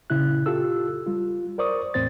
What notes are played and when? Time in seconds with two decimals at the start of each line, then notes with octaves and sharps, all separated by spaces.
0.10 A#2 C#3 E4 F#6
0.46 F4 G4 A4 E6
1.07 G3 F4
1.58 A#4 C5 D5 C#6 D#6
1.94 E2 A2 C4 C5 A6